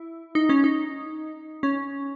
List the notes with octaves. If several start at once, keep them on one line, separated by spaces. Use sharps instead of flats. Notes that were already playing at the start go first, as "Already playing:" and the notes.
Already playing: E4
D#4
C#4
D#4
C#4